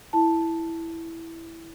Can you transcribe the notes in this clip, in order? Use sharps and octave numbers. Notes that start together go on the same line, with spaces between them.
E4 A5